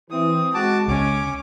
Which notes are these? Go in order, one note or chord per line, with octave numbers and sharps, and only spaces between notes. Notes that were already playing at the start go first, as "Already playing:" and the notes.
E3 C4 D#6
G#3 F#4 A5 D6
C#2 C#4 D6